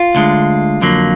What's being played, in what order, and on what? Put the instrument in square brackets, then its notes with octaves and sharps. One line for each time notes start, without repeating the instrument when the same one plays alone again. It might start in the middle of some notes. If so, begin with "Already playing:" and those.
Already playing: [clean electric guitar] F4
D2 D3 G#3
F2 D3 F#3 A#3